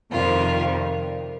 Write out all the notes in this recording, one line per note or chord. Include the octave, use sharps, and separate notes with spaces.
F2 C3 D#3 G3 F4